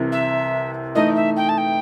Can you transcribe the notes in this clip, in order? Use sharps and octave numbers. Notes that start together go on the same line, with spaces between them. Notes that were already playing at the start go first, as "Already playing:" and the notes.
Already playing: C2 C3 E3
E5
E3 A3 D#4 D#5
E5
G5
A5
G5